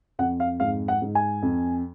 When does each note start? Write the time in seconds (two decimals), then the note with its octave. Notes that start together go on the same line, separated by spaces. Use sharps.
0.19 F2 F#5
0.40 F5
0.60 G#2 F5
0.88 F#5
1.02 G#2
1.15 G#5
1.42 F2